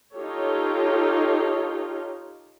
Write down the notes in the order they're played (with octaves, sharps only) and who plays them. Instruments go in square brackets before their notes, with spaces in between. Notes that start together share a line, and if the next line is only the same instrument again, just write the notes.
[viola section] D#4 F4 G4 A4 C#5